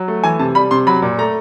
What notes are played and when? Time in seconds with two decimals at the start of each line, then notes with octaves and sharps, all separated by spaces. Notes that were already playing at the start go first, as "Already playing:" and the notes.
Already playing: F#3
0.08 A3
0.24 E3 G#5
0.39 C3 A5
0.55 G3 B5
0.71 C3 C6
0.87 F#3 B5
1.02 A#2
1.18 A3 A#5